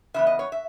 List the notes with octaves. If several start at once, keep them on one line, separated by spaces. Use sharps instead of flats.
C#3 E3 B3 E5
D#5
C#5
E5